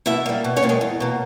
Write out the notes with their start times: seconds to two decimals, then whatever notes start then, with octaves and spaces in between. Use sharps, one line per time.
0.06 B2 E4 E5
0.26 G3 A#3
0.44 B2
0.56 C#4 C#5
0.63 G3 A#3
0.69 G#3 G#4
0.81 E2
1.00 B2 A#3